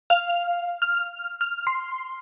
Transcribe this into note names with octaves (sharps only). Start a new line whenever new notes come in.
F5
F6
F6
C6